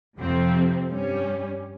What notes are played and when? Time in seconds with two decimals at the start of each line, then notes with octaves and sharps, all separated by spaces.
0.17 F2 C3 F3 C4
0.88 G2 G3 C#4